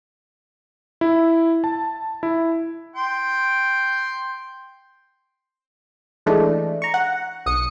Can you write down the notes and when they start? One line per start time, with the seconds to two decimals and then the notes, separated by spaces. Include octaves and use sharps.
1.01 E4
1.64 A5
2.23 E4
2.96 G5 C6
6.26 E3 G#3 A3 D4 D#4
6.82 A#5 C#6
6.94 F#5
7.46 B1 D#6 C#7